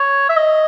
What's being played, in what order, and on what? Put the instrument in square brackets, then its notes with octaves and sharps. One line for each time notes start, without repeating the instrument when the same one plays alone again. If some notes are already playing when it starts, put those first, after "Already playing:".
Already playing: [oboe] C#5
E5
D#5